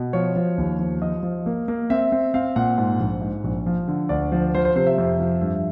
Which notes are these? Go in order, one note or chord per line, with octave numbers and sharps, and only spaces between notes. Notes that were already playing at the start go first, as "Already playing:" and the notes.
Already playing: B2
F3 C#5
F3
D#2
F3
F3 D#5
F3
A#3
A#3
C4 E5
C4
C4 F5
A#2 F#5
G#2
A#1
G#2
A#1
F3
D3
D2 D5
F3
F3 C5
C5
C3 C5
E5
F2
F3
G2 E5